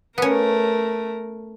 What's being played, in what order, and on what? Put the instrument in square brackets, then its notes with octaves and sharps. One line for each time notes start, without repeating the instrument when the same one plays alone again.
[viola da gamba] A3 A#4 [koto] B3 C#4